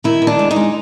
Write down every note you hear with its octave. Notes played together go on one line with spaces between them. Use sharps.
D#3 E4
D#3
D4
G#3
D#4
G#3